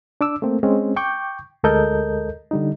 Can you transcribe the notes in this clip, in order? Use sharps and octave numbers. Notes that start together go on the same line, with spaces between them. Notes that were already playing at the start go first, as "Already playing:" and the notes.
D4 D6 E6
A3 A#3 C4
G#3 C4 C#4
G5 C#6 D6 G6
D2 G#3 A4 A#4 D#5 G6
D3 G3 D#4